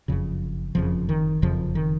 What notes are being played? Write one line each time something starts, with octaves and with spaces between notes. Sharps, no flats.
F#1 F2 C#3
F#1 F2 C#3 F3
D#3
F#1 F2 C#3 F3
D#3